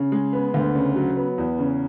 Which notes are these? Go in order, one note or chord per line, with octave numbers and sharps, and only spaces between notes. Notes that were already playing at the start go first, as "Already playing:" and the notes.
Already playing: C#3
G#3
B3
D2
C#3
F#3
B3
E2
C#3